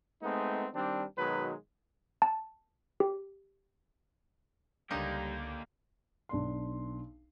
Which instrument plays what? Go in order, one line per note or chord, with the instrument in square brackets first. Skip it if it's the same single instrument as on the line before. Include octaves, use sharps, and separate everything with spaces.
[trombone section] G#3 A3 B3 C4 D#4
D#3 G3 C4 D4
B2 D#3 F#3 G#3 B4
[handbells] A5
G4
[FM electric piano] C#2 G6 [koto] D3 D#4 [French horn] G3 [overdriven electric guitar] A#3 G4
[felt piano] B1 D4 C6